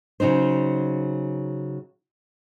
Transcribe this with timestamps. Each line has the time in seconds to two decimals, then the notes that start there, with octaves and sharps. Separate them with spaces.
0.20 C#3 F#3 D#4 C5